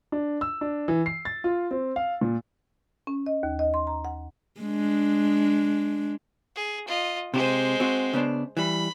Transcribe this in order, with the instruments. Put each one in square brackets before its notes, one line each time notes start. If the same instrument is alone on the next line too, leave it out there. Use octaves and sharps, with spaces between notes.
[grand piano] D4
E6
D4
E3
C7
A6
F4
C4
F5
A#2
[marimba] C#4
D#5
D#2
D#5
C6
A#5
F#5
[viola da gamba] G#3 D4
[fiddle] G#4
F4 D#5
[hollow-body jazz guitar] C3 G4 [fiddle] G#3 C5
[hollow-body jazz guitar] C4 F#4
C#3 B3 D4
[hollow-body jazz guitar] E3 G3 [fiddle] B5